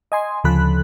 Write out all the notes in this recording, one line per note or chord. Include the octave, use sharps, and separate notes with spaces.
D#5 G#5 C6
D2 C#3 F3 A4 B5 F#6